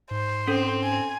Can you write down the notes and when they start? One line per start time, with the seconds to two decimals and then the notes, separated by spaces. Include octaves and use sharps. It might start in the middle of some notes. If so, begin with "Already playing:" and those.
0.11 G#2 C5
0.48 C4 C#4 A4
0.84 G#5